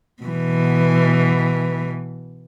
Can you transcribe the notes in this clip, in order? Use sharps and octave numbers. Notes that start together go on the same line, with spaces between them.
B2 E3